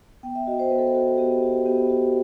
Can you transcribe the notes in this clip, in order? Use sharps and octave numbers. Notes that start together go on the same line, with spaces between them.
B3 G5
E5
F#4 D#5
C5
B3 B4
A4
B4
F#4
B3 G4
F#4
B3 G4
F#4